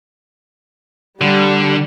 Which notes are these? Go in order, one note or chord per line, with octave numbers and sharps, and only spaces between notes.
D3 G3